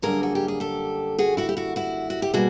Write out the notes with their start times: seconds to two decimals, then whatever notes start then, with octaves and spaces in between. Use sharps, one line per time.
0.02 F#2 D3 G3 A#3 G#4 A#4
0.23 F#4
0.35 G4
0.48 G#4
0.60 G4 A4
1.18 F#4 G#4
1.37 E4 F#4
1.49 G4
1.57 E4 F#4
1.76 E4 F#4
2.10 F#4
2.22 G4
2.33 B2 G3 A#3 F#4 G#4